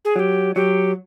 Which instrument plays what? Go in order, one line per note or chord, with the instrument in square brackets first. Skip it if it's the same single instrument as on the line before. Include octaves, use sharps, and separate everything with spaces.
[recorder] G#4
[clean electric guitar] F#3 [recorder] G#4
[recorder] G4
[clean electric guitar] F#3 [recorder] G4